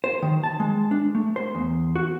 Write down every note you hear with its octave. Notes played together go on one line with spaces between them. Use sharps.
C5
D#3
A5
G#3
D4
A3
C5
E2
F#4